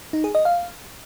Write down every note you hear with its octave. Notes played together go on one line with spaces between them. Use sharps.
D#4
G#4
D#5
F5